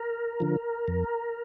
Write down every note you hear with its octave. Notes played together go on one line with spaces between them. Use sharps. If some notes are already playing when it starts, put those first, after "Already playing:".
Already playing: A#4
D3 F3
F2